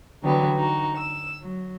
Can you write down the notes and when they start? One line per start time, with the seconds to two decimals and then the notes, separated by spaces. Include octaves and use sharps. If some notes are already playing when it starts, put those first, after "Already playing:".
0.22 D3 E3 F#3 G3 B3
0.56 D#4 F#4
0.96 E6
1.40 F#3